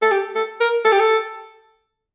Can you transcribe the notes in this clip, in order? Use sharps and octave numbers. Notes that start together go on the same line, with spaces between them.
A4
G4
A4
A#4
A4
G4
A4